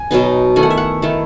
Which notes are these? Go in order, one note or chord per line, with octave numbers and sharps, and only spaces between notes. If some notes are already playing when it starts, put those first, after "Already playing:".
Already playing: G#5
B2 F#3 B3 D#4
D#3 A3 E4 G#5
F#5
E5
F#5
D#3 A3 E4